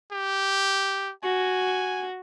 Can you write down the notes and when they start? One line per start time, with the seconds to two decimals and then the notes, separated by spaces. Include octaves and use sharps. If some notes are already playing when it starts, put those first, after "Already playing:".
0.12 G4
1.24 F#4 G#5